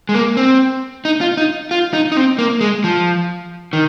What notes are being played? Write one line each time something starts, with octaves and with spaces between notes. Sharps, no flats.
G#3
A#3
C4
D#4
F4
D#4
F4
D#4
D#4
C4
A#3
G#3
F3
D#3